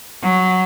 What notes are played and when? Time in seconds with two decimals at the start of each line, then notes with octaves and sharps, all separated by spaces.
0.22 F#3